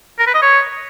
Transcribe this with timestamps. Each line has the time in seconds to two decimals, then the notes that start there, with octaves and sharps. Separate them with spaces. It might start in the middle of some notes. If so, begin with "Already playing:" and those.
0.19 A#4
0.27 B4
0.35 D#5
0.42 C#5